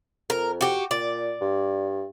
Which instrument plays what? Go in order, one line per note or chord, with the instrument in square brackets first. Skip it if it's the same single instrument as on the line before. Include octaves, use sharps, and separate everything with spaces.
[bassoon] F2 [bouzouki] A#4
[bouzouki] F#4 G4
[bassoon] A#2 [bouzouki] D5
[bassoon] G2